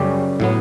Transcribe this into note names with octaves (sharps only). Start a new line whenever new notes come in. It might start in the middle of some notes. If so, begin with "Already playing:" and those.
Already playing: F#2 C#3 G3 C#4 G4
A2 F#3 B3